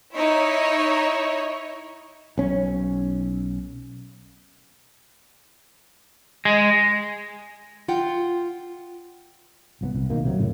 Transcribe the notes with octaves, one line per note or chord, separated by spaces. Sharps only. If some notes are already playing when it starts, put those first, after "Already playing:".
D#4 E4 C#5
B1 C#4
G#3
F4 F#5 G5
C2 F3 B3
C2
B2 D#3 A#3
C3 F#3
F2 A2 C#3